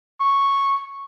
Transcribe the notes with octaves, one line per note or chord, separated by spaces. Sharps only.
C#6